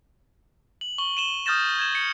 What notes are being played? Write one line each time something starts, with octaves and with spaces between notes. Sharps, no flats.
F#7
C#6 F#7 G7
D#7 E7 G7
D#6 F6 G6 A6 A#6 E7
G#6 E7
C#7